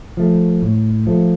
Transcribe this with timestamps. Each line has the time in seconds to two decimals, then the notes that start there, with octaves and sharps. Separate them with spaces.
0.17 F3 A3
0.62 A2
1.07 F3 A3